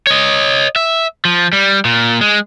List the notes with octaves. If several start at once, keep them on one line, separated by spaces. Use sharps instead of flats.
C#5 D#5
E5
F3
G3
A#2
G#3